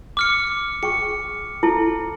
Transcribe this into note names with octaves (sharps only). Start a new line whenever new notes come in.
D6 F6 C#7
G#4 G5 C#6 C#7
E4 A4 A5